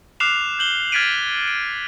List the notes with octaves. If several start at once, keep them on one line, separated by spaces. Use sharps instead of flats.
D6 F6 F#6 C7 E7 F7
G6 F#7 G7
F6 G#6 A6 B6 D7 D#7
D7